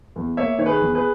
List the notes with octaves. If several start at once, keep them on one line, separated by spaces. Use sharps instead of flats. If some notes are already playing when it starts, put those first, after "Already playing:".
E2
A#3 C#5 E5
D#3 C#5
G#4 B4
E2
G#4 B4